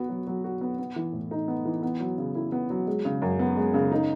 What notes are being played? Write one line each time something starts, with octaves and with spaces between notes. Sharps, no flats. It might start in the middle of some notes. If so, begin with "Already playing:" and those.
Already playing: B3 F#4
F#3
F#3
F#4
B3
B3
E3
A2
D#4
B3
E3
B3
F#3
C#3
E4
B3
F#3
G#3
C#3
F#2
B3
G#3
C#3
D#4